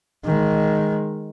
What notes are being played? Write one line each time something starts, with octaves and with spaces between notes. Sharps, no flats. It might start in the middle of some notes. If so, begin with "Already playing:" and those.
D#3 G#3